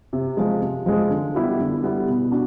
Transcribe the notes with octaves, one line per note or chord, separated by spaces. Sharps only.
C3
F3 G#3
C3
F3 G#3
D3
G3 B3 E4 G4
D3
G3 B3 E4 G4
B2
D4 F#4